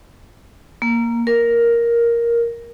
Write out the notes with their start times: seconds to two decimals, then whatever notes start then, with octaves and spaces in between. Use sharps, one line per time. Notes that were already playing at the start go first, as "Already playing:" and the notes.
0.82 A#3
1.27 A#4